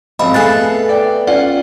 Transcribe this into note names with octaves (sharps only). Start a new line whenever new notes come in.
G#1 F2 C4 D#5 F5 B5
A3 B3 G#4 A4 F5 G#5 F#6 A6
D5 G5
C#4 F4 D5 F#5